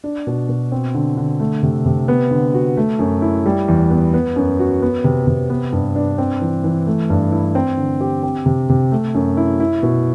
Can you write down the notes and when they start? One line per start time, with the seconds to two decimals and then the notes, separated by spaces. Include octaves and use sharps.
0.04 D4
0.27 B2
0.49 B2
0.72 C4
0.95 D3
1.17 D3
1.40 A3
1.63 C3
1.86 C3
2.08 B3
2.31 D3
2.54 F#4
2.77 A3
2.99 F#2
3.22 E4
3.46 G3
3.68 E2
3.90 B3
4.14 B3
4.36 F#2
4.59 F#4
4.82 B3
5.04 C3
5.27 C3
5.50 B3
5.73 G2
5.96 D4
6.18 C4
6.41 E3
6.64 E3
6.87 A3
7.10 G2
7.32 E4
7.55 C4
7.77 D3
8.01 G4
8.23 C4
8.46 C3
8.69 C3
8.92 A3
9.15 F#2
9.37 E4
9.60 E4
9.83 B2